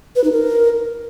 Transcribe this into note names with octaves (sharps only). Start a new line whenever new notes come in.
B4
D#4
A#4